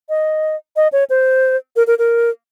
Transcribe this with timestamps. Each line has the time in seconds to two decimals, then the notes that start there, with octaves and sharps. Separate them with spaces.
0.09 D#5
0.76 D#5
0.92 C#5
1.10 C5
1.76 A#4
1.87 A#4
1.99 A#4